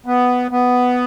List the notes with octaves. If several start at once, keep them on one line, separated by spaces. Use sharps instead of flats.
B3
B3